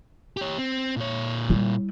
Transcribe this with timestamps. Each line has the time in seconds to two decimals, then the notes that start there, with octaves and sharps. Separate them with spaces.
0.37 G4 C#5
0.58 C4
0.97 A#2 C#5
1.50 G3 E4